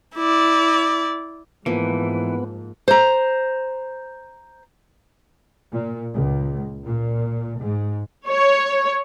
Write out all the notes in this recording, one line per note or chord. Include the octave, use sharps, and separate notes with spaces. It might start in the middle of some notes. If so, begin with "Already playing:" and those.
E4 D5
G#2 E3 F3 A#3 B3
C5 A#5
A#2
C#2
A#2
G#2
C#5